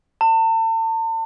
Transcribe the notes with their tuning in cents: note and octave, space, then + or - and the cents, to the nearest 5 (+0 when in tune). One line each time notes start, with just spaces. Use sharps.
A5 +40